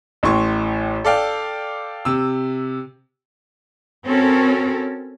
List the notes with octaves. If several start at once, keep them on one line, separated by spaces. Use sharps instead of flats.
A1 A2 C6 C#6
A4 D5 F5 G5
C3 E6
C4 C#4 F#4 A4 A#4